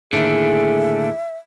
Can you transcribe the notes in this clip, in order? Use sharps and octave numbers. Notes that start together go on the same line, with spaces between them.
A2 D3 D#3 A3 A#3 D4 G#4 E5